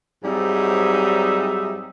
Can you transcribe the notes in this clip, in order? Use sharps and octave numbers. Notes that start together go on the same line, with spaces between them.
G#2 F#3 G3 C4 D#4 E5